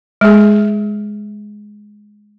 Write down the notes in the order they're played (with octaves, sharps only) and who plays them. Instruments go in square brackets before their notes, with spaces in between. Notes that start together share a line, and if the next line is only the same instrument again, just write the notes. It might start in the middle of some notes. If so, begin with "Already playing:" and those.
[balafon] G#3 G#4